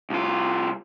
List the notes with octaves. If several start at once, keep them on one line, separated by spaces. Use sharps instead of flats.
C2 F4